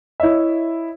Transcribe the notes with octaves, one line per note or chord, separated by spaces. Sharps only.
E4 C#5 D#5 E5